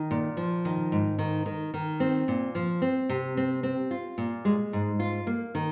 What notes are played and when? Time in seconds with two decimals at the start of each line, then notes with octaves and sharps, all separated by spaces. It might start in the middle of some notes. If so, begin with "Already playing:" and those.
Already playing: D#3
0.11 A#2
0.37 F3
0.65 D#3
0.92 G#2
1.19 D#3
1.46 D#3
1.74 D#3
2.00 C4
2.28 A#2
2.55 F3
2.82 C4
3.09 C3
3.37 C4
3.63 C4
3.91 F4
4.18 A#2
4.45 G#3
4.73 G#2
5.00 F4
5.27 A#3
5.55 D#3